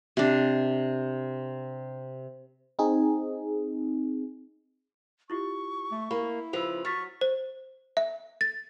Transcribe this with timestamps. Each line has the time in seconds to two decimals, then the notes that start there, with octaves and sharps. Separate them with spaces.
0.17 C3 D4
2.79 C4 D#4 G#4
5.30 E4 F4 G4 C#6
5.91 A3
6.11 A#3 E4 B5
6.53 C#3 F3 B4 E6 F7
6.85 F#3 C#6 F6 A6 B6
7.21 C5
7.97 E5
8.41 A6